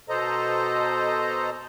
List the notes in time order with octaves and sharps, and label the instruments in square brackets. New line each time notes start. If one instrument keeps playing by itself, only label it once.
[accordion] B2 A4 C5 D#5 A#5